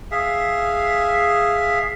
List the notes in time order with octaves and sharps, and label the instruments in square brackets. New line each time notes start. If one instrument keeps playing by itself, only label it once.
[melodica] G#4 E5 F5